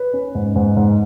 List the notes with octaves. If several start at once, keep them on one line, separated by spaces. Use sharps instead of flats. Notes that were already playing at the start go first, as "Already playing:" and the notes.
Already playing: B4
C#4
G#2
G#2
G#2